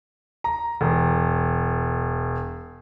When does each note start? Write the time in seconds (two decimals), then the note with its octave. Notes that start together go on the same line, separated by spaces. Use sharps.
0.44 A#5
0.81 E1